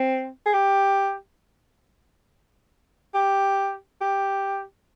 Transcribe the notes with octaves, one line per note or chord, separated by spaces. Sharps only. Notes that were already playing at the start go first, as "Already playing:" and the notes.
Already playing: C4
G#4
G4
G4
G4